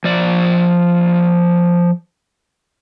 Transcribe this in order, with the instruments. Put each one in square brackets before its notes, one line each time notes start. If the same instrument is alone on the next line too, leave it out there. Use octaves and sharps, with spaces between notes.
[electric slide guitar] F3 D5